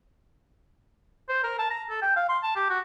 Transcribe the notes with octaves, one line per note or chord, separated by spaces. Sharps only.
C5
A#4
A5
A#5
A4
G5
F5
C6
A5
G4
F#4